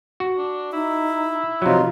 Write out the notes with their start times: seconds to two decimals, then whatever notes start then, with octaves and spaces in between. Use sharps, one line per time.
0.20 F#4
0.37 D4
0.73 D#4 E4
1.62 C3 F3 F#3 D#4 F4